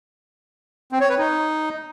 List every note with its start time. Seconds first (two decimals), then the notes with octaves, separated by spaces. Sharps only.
0.92 C4
1.01 C#5
1.09 B4
1.18 D#4